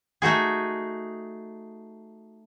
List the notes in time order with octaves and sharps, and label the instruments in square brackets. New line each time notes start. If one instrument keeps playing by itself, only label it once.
[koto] A3 D#4 F#4 G#4